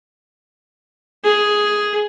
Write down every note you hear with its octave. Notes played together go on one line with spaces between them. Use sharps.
G#4